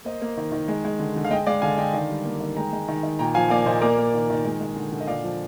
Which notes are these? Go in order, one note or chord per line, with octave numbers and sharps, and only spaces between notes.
A#3 C5 D#5
A#3
D#3
D#3
G#3
G#3
D3
D3
F5
G#3 D#5 G5
G#3 D5 F5
D3 F5 G#5
D3 D#5 G5
D#3 D5 F5
G3
A#3
D#3
G#3 G5 A#5
G#3
D#3
D#3
A#2 G5 A#5
F3 F5 G#5
A#3 D5 F5
A#2 C5 D#5
A#3 A#4 D5
A#3
D#3
D#3
G#3
G#3
D3
D3
D#5
A#2 D5 F5
F3